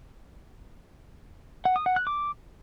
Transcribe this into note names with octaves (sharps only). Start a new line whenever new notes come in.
F#5
D#6
F#5
F#6
D6